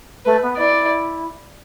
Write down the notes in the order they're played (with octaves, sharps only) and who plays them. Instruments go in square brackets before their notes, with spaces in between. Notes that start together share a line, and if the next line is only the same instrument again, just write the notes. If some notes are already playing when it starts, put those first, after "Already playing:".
[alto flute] A3 [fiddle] B4
[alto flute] B3
[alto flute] E4 [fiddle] D5